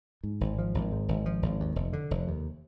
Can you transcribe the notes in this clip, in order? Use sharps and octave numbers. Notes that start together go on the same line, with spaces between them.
G#2
G#1
F3
G#1
G#2
G#1
F3
G#1
D#2
F1
D3
F1
D#2